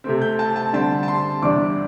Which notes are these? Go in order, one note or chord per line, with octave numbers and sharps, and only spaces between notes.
C3 A3 C4
G6
A5
A5
D3 G3 C4 A5
A5
C6
E2 C3 G3 D4 D6